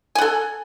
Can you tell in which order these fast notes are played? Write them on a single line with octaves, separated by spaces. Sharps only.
G#5 F#5 A4